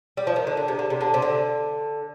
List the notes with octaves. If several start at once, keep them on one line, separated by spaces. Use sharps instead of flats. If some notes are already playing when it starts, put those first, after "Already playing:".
G3
F3
D#3
D3
D3
C3
D3
C3
D3
C3
D3